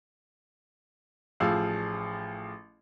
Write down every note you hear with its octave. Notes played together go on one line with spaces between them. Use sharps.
A1 F3 G#4 F5 E6